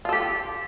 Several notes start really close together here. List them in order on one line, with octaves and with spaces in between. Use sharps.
F4 A4 G4